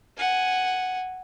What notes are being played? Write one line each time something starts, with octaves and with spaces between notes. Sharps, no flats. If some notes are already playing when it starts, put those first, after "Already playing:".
F#5 G#5